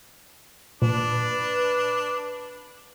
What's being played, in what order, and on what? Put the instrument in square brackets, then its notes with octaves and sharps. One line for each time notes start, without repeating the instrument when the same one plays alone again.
[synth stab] A#2 [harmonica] D4 [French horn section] B4